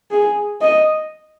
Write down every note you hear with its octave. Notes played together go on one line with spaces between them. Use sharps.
G#4
D#5